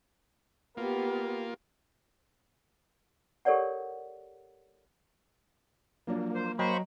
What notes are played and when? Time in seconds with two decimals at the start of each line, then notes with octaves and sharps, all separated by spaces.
0.77 A#3 B3 F4 G4
3.45 G4 A4 A#4 C#5 D5 F#5
6.07 F3 F#3 A#3 D4
6.34 C5
6.59 F#3 C5 D#5 G5 A#5 B5 C#6